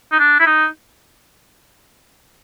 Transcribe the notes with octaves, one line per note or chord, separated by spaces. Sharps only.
D#4
D4
E4
D#4